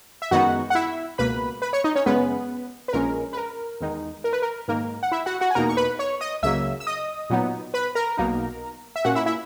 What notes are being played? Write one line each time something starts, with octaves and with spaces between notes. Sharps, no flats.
E5
F#2 D#3 G#3 B3 D#4 F#4 F#5
F#5
E4 E5
C#2 B2 A#3 B4 B5
B4 B5
C#5 C#6
D#4 D#5
C#4 C#5
F#2 C#3 G#3 B3 C#4 B4
B4
A#1 A#2 G#3 C#4 A#4
B4
A#4
E2 D#3 G#3 D#4
A#4
B4
A#4
G#2 D#3 A#3 A#4
F#5
E4 E5
F#4 F#5
F#4 F#5
G#5
E2 B2 A#3 D#4 A#4 A#5
C#6
B4 B5
C#5 C#6
D#5 D#6
C#2 C#3 F#3 A#3 E5 E6
E6
D#5 D#6
A#2 F#3 B3 D#4
B4 B5
A#4 A#5
B1 B2 A#3 D#4
E5
A#2 A#3 C#4 F#4 F#5
E4 E5
E4 E5